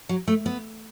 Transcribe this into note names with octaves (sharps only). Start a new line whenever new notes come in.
F#3
A3
B3